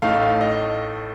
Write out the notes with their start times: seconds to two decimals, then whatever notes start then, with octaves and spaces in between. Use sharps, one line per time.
0.02 A1 A2 A3 D#4 F5
0.41 D#5